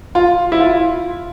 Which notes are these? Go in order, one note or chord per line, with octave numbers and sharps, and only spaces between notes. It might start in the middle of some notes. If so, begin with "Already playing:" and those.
F4
E4
F4